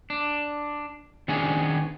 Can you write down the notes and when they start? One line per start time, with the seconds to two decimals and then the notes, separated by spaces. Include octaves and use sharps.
0.10 D4
1.28 D#3 B3 C#4 D4 G#4